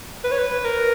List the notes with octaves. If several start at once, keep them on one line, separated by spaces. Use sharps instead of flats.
B4
C#5
B4
A#4